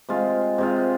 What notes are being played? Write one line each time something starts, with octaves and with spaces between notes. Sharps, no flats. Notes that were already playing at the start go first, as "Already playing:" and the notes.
C3 G#3 F4
C3 G#3 F4